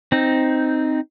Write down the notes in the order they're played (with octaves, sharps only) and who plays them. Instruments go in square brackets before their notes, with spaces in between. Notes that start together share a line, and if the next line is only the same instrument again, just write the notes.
[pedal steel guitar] C4 D#4